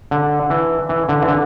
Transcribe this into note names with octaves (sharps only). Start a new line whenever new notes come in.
D3
E3
E3
D3
E3
D3